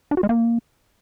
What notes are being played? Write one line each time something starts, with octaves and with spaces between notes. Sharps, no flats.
D4
F#4
G#3
A#3